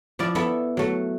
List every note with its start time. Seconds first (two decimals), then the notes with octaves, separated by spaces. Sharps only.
0.19 F3 E4 D5
0.35 B3 E4 A4 E5 B5
0.77 F#3 A3